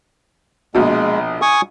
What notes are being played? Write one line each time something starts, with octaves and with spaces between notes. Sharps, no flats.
A#1 B2 G#3
G#5 C#6 D#6